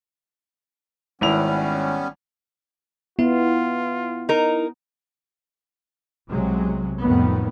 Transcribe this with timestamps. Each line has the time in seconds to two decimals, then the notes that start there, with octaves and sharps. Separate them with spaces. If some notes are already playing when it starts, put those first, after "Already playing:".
1.21 G#1 G3 B3 C#4 E4 F7
3.19 B3 E4 F4
4.29 D#4 A#4
6.30 B1 C3 F#3 G#3
7.00 F2 A2 D#3 G3 B3